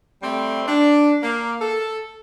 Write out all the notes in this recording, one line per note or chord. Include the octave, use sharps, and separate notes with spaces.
G3 A3 C4
D4
A#3
A4